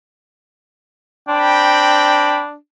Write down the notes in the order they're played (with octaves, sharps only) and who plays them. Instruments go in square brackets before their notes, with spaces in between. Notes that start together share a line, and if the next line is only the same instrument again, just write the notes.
[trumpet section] C4 G5 B5 [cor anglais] D4